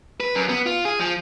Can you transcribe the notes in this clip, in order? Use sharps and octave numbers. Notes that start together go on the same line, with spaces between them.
B4
F#2
B3
F4
G#4
F3